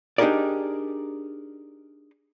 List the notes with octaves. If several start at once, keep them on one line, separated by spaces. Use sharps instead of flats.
D4 D#4 G4 G#4 A#4 D5